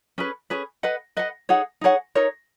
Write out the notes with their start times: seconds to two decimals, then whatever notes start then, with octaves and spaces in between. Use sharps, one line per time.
0.18 C#4 G#4 B4
0.50 C#4 G#4 B4
0.83 B4 D#5 F#5
1.17 B4 D#5 F#5
1.49 D#4 G#4 C#5 F#5
1.81 D#4 G#4 C#5 F#5
2.15 D#4 A#4 C#5